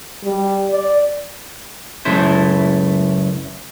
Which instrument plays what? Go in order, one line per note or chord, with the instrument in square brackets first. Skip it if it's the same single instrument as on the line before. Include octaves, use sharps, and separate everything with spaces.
[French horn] G3
D5
[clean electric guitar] C#2 F#2 A3 E4 C5